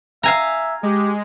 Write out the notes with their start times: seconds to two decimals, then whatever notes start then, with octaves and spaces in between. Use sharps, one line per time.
0.23 E5 F5 G#5 A#5
0.83 G#3 G4